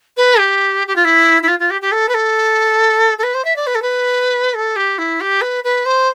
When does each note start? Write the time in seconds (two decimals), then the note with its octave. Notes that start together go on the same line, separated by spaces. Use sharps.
0.17 B4
0.39 G4
0.87 G4
0.96 F4
1.05 E4
1.43 E4
1.48 F4
1.59 F4
1.70 G4
1.82 G4
1.92 A4
2.09 B4
2.14 A4
3.18 A4
3.23 B4
3.34 C5
3.45 E5
3.56 D5
3.67 B4
3.75 A4
3.82 B4
4.54 A4
4.76 G4
4.98 E4
5.21 G4
5.41 B4
5.64 B4
5.85 C5